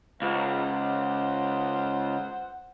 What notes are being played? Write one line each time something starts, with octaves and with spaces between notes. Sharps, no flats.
C#2 C5 F#5